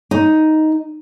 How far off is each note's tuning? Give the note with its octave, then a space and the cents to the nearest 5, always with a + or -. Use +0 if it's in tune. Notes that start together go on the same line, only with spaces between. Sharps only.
D#4 +5